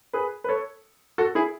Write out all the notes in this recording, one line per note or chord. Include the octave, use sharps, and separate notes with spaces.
G#4 B4
B4
A4 C#5
F#4 A4
E4 G#4